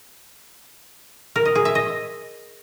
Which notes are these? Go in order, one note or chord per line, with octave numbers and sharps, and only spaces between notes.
A#4
D#5
G#4
E5
D#5